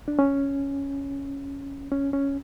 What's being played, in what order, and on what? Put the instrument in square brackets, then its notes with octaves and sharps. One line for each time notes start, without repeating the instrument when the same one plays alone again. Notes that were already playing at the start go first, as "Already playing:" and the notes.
[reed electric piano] D4
C#4
C#4
C#4